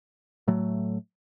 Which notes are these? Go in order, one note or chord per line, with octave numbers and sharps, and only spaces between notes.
A2 F#3 A3